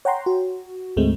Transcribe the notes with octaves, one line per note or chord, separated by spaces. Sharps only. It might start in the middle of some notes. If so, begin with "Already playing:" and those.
C#5 F#5 G5 A#5 C6
F#4
D2 G#2 G#3 A3 C4